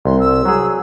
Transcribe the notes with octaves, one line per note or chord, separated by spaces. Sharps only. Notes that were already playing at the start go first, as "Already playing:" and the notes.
C2 C6
E6
F#3 G#4